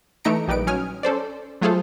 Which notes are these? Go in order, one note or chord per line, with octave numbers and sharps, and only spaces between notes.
E3 A3 D#4 A#5 C#7 D7
A#1 G3 D#4 B4 D7
F#3 C#4 G#5 D#6 F6
C#4 A4 C5 D5
F#3 A3 F4 G#4 A4 C5